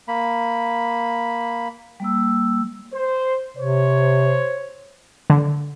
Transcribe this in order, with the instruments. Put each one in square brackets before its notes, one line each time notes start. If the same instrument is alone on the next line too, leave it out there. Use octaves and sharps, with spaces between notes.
[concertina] A#3 B5
[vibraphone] G3 A#3 E6
[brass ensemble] C5
[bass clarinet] C3 [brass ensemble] C5 C#5
[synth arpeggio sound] D3